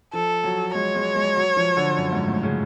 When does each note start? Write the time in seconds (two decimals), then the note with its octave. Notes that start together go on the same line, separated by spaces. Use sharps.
0.13 F3 A4
0.44 F#3
0.74 G#3 C#5
0.95 G#3
1.15 G#3
1.36 F#3
1.57 F3
1.77 D3
1.97 F#2
2.12 G#2
2.28 A2
2.43 C#3